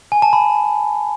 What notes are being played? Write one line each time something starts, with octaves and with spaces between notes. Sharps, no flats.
G#5
A5
B5